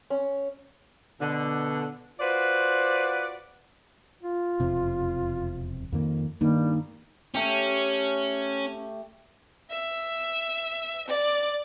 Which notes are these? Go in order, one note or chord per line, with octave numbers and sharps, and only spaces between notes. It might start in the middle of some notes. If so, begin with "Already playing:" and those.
C#4
B2 D3
F4 F#4 B4 C5 D5
F4
E1 F2 C3
F2 D#3 A#3
G2 D#3 G3 A#3 D#4
A3 C#4 G4
E5
D5